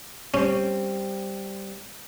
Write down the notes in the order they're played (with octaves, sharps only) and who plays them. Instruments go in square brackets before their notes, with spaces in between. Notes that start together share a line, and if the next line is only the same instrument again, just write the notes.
[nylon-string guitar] G3 C4 [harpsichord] C#4